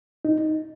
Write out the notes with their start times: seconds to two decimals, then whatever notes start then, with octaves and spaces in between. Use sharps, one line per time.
0.25 D#4